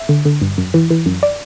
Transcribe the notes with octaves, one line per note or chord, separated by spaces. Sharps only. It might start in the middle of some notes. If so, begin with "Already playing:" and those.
Already playing: E5
D3
D3
G2
F#2
E3
E3
F#2
D5